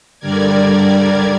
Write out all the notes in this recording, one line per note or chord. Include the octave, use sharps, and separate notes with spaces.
G2 D3 G3 A#4 D5 G#6